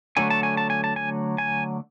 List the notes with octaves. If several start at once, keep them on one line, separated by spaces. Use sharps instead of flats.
D3 F#3 A3 G#5
A5
G#5
A5
G#5
A5
G#5
G#5